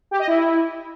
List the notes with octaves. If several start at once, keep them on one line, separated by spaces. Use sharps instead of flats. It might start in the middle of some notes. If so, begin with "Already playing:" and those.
G4
D#5
E4